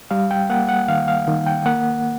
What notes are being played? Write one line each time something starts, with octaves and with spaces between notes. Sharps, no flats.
G3 F5
G5
A#3 F#5
F#5
D#3 F5
F5
D#3
G5
A#3 F#5